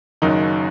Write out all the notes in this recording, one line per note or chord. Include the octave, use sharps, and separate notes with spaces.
F#1 F#2 D#3 D#4